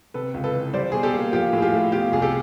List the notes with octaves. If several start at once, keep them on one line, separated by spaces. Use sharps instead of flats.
C3 A4 B4
C#2
A4 B4
E3
G3 C5 D5
B2 G#4
G4 A4
A#3
F3 F4 G4
A2 G#4
F4 G4
A3
B2 F4 G4
C2 G#4
G4 A4